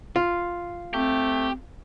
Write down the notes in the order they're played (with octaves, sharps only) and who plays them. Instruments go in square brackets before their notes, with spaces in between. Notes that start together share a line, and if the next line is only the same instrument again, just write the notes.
[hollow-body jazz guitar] F4
[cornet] A3 [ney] C4 [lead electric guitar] G4